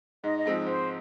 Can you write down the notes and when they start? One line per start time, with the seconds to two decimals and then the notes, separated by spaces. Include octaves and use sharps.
0.24 G#2 D#5
0.38 D#5
0.46 F3 G#3 C4 D#4
0.66 G#2 C5